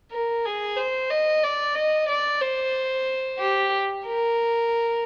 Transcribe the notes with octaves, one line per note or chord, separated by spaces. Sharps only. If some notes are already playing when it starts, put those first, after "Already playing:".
A#4
G#4
C5
D#5
D5
D#5
D5
C5
G4
A#4